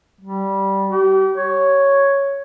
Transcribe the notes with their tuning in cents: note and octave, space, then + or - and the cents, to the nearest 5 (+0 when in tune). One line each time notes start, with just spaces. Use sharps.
G3 -10
G4 -35
C#5 +0